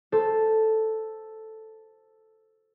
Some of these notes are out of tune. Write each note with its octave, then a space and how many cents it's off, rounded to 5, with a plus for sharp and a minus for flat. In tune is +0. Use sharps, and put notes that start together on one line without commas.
A4 +0 C5 +0